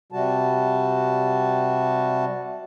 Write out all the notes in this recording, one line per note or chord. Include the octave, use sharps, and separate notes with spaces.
C3 G3 F#4 A5